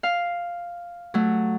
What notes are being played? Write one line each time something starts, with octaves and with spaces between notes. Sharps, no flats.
F5
F#3 A3